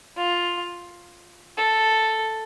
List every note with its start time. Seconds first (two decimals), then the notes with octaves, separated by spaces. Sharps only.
0.17 F4
1.58 A4